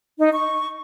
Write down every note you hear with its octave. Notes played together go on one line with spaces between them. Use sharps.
D#4
C#6